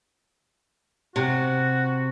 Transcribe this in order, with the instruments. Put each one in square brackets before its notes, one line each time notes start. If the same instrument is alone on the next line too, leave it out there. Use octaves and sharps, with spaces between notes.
[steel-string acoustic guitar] C3 [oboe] F#4